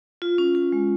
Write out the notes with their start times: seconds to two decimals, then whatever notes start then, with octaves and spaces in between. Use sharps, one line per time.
0.22 F4
0.38 C#4
0.55 F4
0.72 G#3